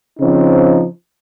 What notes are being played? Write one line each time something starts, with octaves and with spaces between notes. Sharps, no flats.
C#3 F3 C4 D#4